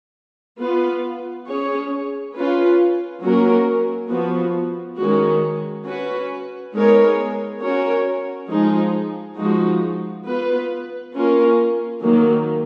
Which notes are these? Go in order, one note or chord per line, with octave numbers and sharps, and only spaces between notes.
B3 F4 B4
C#4 G#4 C#5
C#4 F4 B4
F#3 A#3 C#4 F#4 A#4
F3 B3 F#4
D#3 G#3 C#4 F#4
C#4 F#4 B4
G#3 B3 D#4 A#4 C#5
C#4 F#4 A#4 C#5
F3 G#3 D#4 G#4
F3 G#3 D#4 F#4
B3 F4 B4
A#3 C#4 F4 A#4
D#3 F#3 A#3